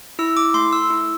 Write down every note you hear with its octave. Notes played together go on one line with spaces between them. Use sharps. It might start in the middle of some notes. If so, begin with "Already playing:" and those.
E4 E6
D6
A3 C6
E6
E4